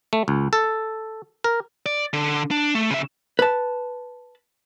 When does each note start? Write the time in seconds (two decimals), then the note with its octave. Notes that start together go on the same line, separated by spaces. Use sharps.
0.13 A3
0.28 C#2
0.53 A4
1.44 A#4
1.86 D5
2.13 D3
2.51 D4
2.75 A3
2.91 C#3 E5
3.39 B4 A5